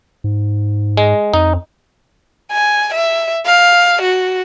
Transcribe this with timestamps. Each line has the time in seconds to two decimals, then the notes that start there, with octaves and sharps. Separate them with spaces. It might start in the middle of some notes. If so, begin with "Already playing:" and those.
0.24 G#2
0.97 G#3
1.34 F2 D#4
2.52 G#5
2.94 E5
3.46 F5
4.02 F#4